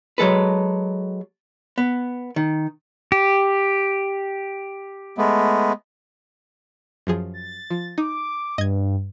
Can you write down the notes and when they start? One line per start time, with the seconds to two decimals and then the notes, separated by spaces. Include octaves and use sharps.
0.18 F#3 G#3 A4 B4
1.78 B3
2.36 D#3
3.12 G4
5.18 G#3 A3 B3
7.07 F#2 F3 G#4
7.34 A6
7.70 F3
7.98 D#4 D6
8.58 G2 D#5 G#6